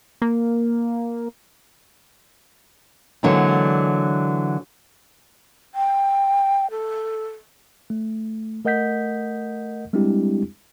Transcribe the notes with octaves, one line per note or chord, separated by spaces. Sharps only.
A#3
D3 E3 F#3 G#3 A#3 C4
G5
A4
A3
A3 A#4 D#5 F#5 G6 B6
G3 G#3 C4 D4 E4 G4